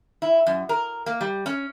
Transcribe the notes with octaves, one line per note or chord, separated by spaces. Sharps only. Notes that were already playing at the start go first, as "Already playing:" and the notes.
E4
F#2
A#4
A#3
G3
C#4